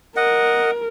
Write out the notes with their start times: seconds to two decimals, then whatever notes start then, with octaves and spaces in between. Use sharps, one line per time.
0.16 A#4 D#5 F#5